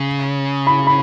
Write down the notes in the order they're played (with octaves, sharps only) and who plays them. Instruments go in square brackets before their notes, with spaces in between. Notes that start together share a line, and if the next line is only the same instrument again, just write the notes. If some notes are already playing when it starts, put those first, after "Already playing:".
Already playing: [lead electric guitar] C#3
[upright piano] B5
B5